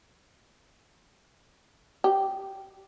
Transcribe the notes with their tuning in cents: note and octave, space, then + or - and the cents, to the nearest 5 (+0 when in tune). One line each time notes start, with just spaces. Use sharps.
G4 -10